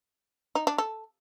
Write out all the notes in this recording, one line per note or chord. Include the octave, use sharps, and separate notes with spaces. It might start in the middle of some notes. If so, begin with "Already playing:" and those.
D#4
D4
A4